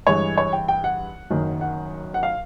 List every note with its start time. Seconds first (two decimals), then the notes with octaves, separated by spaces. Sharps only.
0.07 G2 E3 G#3 C#5
0.38 C#5
0.53 G5
0.68 G5
0.84 F#5
1.30 F#1 F#2 D#3
1.61 F#5
2.14 F#5
2.23 F5